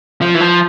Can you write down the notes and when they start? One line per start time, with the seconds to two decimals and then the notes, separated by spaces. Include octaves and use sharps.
0.21 F3
0.35 E3
0.41 F3